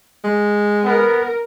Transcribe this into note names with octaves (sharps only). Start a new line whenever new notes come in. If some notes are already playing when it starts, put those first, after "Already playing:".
G#3
B3 A#4